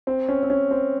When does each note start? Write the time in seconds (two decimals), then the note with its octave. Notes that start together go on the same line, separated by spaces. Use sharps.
0.07 C4
0.28 C#4
0.43 C4
0.50 C#4
0.71 C4